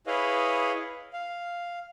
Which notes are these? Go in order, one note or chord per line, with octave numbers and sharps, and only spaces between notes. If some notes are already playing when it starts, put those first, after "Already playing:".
E4 G#4 B4 C#5 D#5 F5
F5